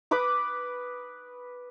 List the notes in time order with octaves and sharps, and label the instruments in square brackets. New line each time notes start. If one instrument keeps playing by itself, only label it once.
[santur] B4 B5 D6 D#6